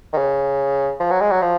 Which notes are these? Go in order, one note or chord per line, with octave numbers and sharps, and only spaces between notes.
D#3
C#3
F3
F#3
G#3
F#3
F3